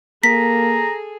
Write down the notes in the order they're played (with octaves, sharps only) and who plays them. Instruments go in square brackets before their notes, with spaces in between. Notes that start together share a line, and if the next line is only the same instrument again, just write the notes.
[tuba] A#3 [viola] G#4 A4 [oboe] A#5 [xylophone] B6